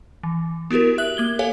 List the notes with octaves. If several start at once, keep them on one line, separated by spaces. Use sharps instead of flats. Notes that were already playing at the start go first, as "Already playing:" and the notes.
E3
B3 E4 F#4 G4 A#4
E5 F#6 F#7
A#3 G#6 G7
G4 A4 C#5 F5 G#5